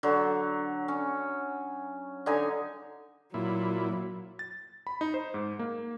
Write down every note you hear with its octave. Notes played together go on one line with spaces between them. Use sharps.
D3 F#3
C#4
D3 D#4 G#5
A#2 F#3 E4
A6
B5
D#4
C5
G#2
A#3